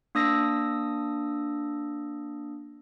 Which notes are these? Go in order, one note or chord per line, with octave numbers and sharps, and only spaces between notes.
A#3 D4 D#6 E6 A#6